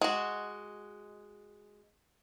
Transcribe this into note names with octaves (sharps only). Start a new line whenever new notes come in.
G#3 F#4